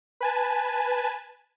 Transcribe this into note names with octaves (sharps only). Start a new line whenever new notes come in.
B4 G#5 A5